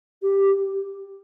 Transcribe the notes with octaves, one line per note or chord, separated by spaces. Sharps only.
G4